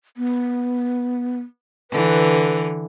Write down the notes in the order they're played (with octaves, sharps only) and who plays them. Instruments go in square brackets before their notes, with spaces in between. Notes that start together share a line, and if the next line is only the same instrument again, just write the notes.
[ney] B3
[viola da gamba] D3 E3 [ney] B4